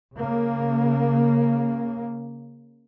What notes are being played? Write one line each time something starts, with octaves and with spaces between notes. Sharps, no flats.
C#3 A#3